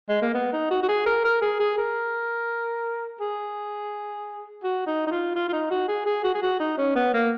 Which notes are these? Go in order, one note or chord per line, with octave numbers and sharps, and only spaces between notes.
G#3
A#3
B3
D#4
F#4
F#4
G#4
A#4
A#4
G#4
G#4
A#4
G#4
F#4
D#4
D#4
F4
F4
F4
D#4
F#4
G#4
G#4
F#4
G#4
F#4
D#4
C#4
B3
A#3